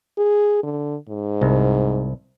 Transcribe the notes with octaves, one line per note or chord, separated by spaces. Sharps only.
G#4
D3
G#2
C2